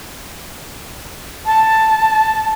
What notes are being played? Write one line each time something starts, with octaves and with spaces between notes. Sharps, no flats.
A5